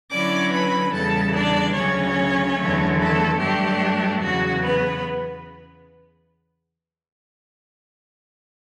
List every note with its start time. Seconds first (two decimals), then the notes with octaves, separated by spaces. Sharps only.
0.11 D3 F#3 C#4 E4 D5 D6
0.52 B4 B5
0.94 E2 C#3 G3 A4 A5
1.35 D4 D5
1.76 D2 C#3 F#3 C#4 C#5
2.58 E2 D3 F#3 A3
2.99 A3 A4
3.39 G2 F#3 A3 D4 G4
4.22 E2 C#3 F#3 F#4
4.63 B3 B4